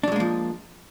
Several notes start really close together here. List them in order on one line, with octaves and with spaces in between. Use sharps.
D4 F#3 G#3 A#3 F3